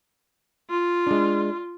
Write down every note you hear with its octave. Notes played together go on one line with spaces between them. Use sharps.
F4
G#3 D4